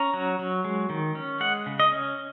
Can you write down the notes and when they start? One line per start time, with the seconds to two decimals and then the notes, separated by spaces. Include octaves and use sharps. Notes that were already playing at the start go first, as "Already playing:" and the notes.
Already playing: C#4 A#5
0.14 F#3
0.39 F#3
0.64 G#3
0.90 D#3
1.15 C#4
1.40 G#3 F#5
1.66 C#3
1.80 D#5
1.92 C#4